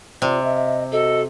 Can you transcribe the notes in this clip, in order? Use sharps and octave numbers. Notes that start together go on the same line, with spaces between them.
C3 F4 D5
D#5 E5
F#4 A4 D#5